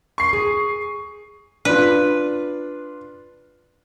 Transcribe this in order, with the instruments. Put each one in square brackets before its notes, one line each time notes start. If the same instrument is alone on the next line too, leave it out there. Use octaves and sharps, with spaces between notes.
[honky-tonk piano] C#6 C7
[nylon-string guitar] G#4
[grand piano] D4 F4 [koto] B4